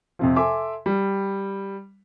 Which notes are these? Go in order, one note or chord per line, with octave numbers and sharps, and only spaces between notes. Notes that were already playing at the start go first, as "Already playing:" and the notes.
F2 C3 F3
A4 E5 G#5 C6 D6
G3